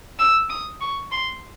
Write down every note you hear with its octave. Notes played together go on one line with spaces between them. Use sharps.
E6
D#6
C#6
C6